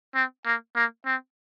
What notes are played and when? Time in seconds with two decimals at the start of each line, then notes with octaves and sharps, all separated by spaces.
0.15 C4
0.46 A#3
0.75 A#3
1.06 C4